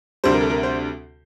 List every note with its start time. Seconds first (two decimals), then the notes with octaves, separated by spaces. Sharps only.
0.24 D2 C3 G3 C5
0.32 A#4
0.41 A4
0.50 A#4
0.63 C5